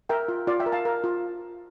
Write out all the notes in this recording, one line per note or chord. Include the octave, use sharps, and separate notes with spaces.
A#4 E5 G5
F4
F4 D5 F5
E5 G5
A#4
F5 A5
A#4
F4